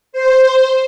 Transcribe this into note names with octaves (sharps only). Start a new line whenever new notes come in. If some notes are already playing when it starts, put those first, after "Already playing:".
C5